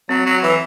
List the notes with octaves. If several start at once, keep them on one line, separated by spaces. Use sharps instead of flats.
F#3 C4
F#3
E3